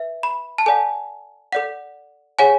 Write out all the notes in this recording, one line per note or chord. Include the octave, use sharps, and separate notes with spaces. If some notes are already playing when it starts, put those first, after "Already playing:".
Already playing: B4 E5
B5
A5
A4 D5 F#5 G#5
A4 D5 F#5
G#4 C#5 F#5 G#5